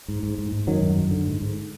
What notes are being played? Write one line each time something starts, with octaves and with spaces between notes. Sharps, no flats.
G#2
G#2
G#2
G#2
F#2 D#3 F#3
F#2
F#2
D3
G#2
G#2